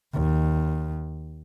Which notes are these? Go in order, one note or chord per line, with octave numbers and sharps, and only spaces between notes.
D#2